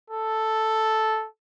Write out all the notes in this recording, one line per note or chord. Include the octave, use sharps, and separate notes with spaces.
A4